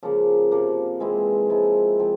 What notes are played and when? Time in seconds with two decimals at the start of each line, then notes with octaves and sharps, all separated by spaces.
0.03 C#3 F3 A#3
0.51 C3 F3 A#3
1.00 E3 G#3 C4 E4
1.50 F3 G#3 E4
1.99 F3 C4